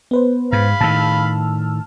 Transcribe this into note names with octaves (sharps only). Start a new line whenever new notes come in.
B3 B4 C5
G#2 F5 B5
A2 D#3 A5 E6 F6